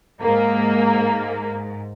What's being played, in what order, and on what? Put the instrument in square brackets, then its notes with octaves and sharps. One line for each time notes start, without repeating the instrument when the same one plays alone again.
[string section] G#2 [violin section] A#3